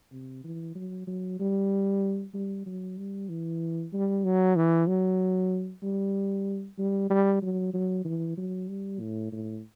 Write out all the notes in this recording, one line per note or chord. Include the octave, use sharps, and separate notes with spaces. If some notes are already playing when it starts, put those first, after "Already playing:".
C3
E3
F#3
F#3
G3
G3
F#3
G3
E3
G3
F#3
E3
F#3
G3
G3
G3
F#3
F#3
E3
F#3
G3
A2
A2